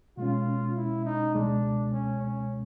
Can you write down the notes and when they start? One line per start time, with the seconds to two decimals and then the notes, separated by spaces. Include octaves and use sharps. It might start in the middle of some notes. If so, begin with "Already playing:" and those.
0.17 B2 G#3 C#4 F4
0.76 E4
1.05 D#4
1.34 C#2 B2 G#3 D4
1.93 C#4
2.22 C#4